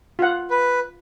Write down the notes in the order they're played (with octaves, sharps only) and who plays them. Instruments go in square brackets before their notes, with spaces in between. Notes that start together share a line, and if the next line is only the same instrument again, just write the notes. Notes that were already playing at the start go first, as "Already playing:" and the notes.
[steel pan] F4 F#5
[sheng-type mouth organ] B4